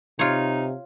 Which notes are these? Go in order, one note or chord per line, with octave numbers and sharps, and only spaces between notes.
C3 D#4 F4 C#5